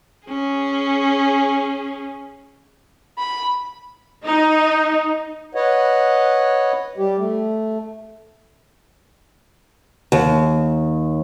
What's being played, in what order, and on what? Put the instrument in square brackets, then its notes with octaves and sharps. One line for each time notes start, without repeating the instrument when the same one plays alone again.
[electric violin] C#4 G#4
[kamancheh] B5
[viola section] D#4
[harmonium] B4 C#5 D#5 F#5
G3 G4
A3
[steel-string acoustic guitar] D#2